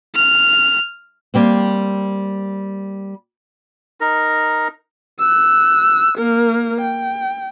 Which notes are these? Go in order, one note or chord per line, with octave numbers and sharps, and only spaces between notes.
F6
G3 A#3 C4
D#4 A#4
E6 F#6
A#3 A#4
G5